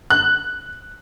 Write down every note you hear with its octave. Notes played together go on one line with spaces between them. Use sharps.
F#6